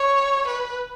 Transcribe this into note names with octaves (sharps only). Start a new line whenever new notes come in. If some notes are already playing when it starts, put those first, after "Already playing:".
Already playing: C#5
B4